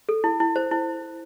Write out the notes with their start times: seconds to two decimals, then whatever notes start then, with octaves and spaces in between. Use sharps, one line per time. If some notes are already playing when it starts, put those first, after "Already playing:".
0.09 A4
0.24 E4
0.40 E4
0.56 C5
0.71 E4